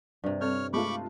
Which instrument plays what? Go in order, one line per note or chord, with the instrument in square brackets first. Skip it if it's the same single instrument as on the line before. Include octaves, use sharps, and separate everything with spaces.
[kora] G2 C3
[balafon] G3 C4 A4 [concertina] C#5 F6
[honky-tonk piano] G#3 A3 F4 [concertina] B5 C#6 D6